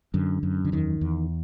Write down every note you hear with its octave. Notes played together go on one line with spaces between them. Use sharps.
F#2 D3
F#2
D3
E2 D#3
E2